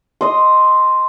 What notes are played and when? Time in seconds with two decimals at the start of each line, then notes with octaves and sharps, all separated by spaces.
0.21 D#5 C6